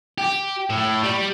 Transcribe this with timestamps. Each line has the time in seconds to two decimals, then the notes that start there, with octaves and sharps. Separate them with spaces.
0.18 G4
0.70 A2
1.04 G3